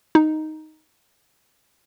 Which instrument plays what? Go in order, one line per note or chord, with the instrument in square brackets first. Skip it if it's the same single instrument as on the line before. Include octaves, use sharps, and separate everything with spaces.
[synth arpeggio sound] D#4